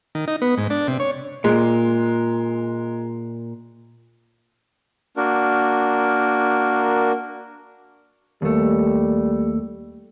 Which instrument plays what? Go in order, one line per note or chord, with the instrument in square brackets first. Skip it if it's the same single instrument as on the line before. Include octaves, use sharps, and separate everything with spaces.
[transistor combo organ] D#3
D#4
B3
G#2
D4
C3
C#5
[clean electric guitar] A#2 [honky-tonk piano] G#3
[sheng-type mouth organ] A#3 D4 F#4 A#4
[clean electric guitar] D#2 A3 [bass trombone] G3